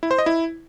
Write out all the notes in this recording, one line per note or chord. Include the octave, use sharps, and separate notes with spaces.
E4
C5
D#5
E4